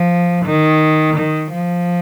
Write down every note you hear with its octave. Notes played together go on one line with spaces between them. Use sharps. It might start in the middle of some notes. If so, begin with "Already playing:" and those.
Already playing: F3
D#3
D#3
F3